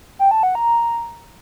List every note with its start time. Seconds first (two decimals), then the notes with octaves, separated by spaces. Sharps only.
0.19 G5
0.31 A5
0.43 F#5
0.55 A#5